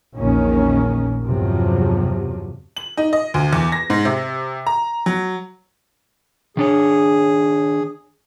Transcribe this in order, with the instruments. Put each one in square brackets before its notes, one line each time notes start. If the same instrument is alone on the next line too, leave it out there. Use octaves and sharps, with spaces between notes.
[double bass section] A#1 E2 D#3 A#3 C#4
E2 G2 C3 F3 F#3
[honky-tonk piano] F#7
D#4
D#5
D2
E2
A#6
G#2
C3
A#5
F#3
[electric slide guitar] D#3 D4 C#5 [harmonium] G#4